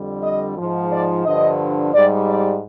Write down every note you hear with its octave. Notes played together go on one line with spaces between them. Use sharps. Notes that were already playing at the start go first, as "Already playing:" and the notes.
Already playing: F2 D3 G3
D#5
G#2 F3
D5
G2 D3 F3 D#5
G#2 G3 D5
D5